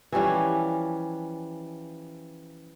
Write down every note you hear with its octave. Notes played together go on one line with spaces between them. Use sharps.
E3 F3 G3 C#4